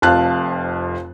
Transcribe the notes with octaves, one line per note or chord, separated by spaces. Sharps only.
F1 F2 F5 A5 F#6